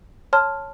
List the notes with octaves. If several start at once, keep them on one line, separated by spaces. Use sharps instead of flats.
C#5 A5 C6 F6